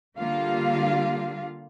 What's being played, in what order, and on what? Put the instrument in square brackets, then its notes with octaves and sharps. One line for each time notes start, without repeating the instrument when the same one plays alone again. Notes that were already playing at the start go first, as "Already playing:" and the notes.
[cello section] D3 G3 A#3 F4 G4 F5